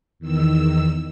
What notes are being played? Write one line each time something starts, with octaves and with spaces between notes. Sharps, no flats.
E2 D#3 E6